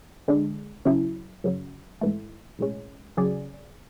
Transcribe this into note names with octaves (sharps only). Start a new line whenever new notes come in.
D3 G#3 D4
C#3 F#3 C#4 E4
F#2 C#3 F#3
G#1 G#2 E3 A3
B1 A2 G#3 C#4
C#3 F#3 C#4 G#4 D5